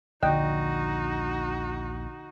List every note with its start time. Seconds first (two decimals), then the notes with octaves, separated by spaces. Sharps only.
0.23 A#1 D#2 D3 D#4 F#4 D#5 G5